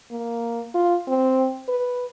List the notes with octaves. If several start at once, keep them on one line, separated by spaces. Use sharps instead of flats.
A#3
F4
C4
B4